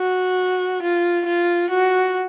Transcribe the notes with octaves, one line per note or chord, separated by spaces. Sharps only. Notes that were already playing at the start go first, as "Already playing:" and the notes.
Already playing: F#4
F4
F4
F#4